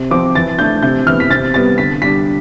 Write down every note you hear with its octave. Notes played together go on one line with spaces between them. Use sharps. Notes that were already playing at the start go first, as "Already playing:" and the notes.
Already playing: C3
F3 C4 D6
E3 A6
A3 D4 G6
C3 G6
E3 B3 F6
B6
C3 A6
G3 B3 A6
D3 B6
G3 D4 B6